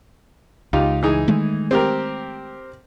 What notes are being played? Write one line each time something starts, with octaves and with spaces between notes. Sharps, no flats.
C#2 D#4 F4 G4
E3 D#4 G#4
D#3 G#3 A3
C4 G4 A#4